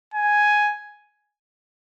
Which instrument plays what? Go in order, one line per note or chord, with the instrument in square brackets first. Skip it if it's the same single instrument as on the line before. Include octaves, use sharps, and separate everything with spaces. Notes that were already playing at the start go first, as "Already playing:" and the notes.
[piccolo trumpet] G#5